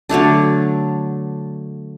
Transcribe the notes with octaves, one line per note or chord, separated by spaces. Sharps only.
D3 F#3 A3 D4